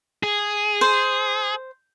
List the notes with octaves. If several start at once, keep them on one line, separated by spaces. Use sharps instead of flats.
G#4
C5